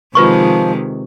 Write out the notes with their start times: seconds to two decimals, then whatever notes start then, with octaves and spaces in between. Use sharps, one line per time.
0.15 C3 D#3 F3 G#3 F4 B4 C#6